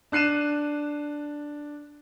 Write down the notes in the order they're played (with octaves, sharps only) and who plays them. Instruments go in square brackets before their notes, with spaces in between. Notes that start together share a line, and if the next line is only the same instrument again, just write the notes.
[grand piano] D4 F#6 C7 D#7 E7